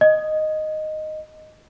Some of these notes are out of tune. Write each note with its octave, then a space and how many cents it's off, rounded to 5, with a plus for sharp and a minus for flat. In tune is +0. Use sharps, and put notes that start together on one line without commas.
D#5 -5